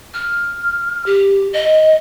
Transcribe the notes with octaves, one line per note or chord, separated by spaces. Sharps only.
F6
G4
D#5